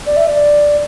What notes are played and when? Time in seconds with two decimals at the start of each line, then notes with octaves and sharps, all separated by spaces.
0.06 D5
0.17 E5
0.28 D5